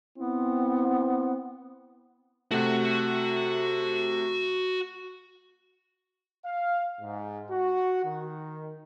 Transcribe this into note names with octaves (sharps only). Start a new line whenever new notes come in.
B3 C4 E4
C3 A3 F#4 F#5
F5
G#2
F#4
D#3